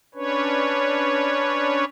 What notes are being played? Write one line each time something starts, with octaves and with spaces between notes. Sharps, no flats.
C#4 D4 B4 C#5